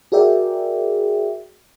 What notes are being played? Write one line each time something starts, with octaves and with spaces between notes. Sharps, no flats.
F#4 G#4 A#4 D5 E5 G5